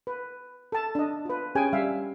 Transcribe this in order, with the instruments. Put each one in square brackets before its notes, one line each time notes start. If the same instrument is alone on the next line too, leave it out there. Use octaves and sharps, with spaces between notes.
[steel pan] B4
A4 A5
D4 D#5
F4 B4
C#4 G4 G#4 G5 G#5
G3 E5 F5